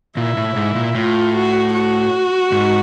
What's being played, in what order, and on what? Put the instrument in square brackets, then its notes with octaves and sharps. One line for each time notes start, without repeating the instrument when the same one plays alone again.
[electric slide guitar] A#2 [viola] E4
[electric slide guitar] A2
G#2
A#2
[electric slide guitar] A2 [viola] F4
[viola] F#4
F#4
[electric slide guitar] G#2